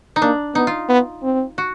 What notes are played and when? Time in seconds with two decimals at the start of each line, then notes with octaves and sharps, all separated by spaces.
0.16 D#4
0.21 A#3 D4
0.55 B3 D#4
0.67 F4
0.89 B3
1.23 C4
1.58 F#4